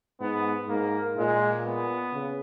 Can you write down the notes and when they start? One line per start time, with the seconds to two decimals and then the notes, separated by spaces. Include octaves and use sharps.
0.21 G#2 B3
0.68 G#2 A#3
1.17 A#2 G#3
1.64 B3
2.13 C#3